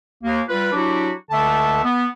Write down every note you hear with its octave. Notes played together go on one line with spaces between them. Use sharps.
D#2 A#3
G3 F4 B4
F#3 D4 E4 F#4 G4
C#2 D3 A3 E5 A5
B3